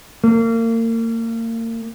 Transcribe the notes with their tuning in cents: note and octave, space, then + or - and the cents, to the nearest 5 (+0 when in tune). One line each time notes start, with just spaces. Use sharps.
A#3 -35